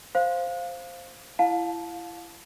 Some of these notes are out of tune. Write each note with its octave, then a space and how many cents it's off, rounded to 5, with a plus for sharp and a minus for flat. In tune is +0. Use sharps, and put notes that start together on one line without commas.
C5 +5 F5 +0
E4 +30 F5 +30 A5 -15